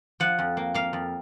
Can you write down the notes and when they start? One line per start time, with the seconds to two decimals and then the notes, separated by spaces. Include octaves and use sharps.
0.20 F3 F#5
0.39 F2
0.57 A#3
0.74 A#3 F5
0.93 F2